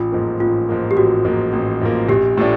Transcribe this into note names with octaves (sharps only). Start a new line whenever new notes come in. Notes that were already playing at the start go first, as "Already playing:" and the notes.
Already playing: A1 F4
G#2 F3 A#3
A1 F4
G#2 F3 A#3
G4
A1 F#4
G#2 F3 A#3
A1
G#2 F3 A#3
A#1 G4
A2 F3 A3 D4